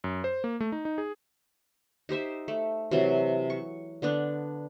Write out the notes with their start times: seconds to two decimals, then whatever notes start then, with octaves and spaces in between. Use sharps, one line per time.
0.04 F#2
0.24 C5
0.44 A#3
0.60 A3
0.72 D#4
0.85 D#4
0.98 G#4
2.09 D#4 G4 C5 E5
2.48 A3
2.91 C3 E3 F#3 C4
3.50 C#6
4.02 D3 B3 D4